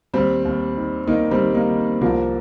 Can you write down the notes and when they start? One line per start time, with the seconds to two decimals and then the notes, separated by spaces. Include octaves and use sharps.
0.14 D#2 G3 C4
0.45 D#2
0.77 D#3
1.07 D#3 A#3 D#4
1.31 G3 C4
1.40 D#3
1.54 A#3 D#4
1.71 D#3
2.01 C2 F3 A#3